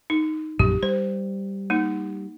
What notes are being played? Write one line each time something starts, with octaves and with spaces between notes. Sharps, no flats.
D#4
A#1 F#2 A2 G4
G3 C5
A#3 D#4